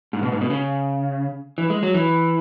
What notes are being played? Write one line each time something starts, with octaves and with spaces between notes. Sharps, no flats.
G#2
B2
G#2
B2
C#3
E3
G#3
F#3
E3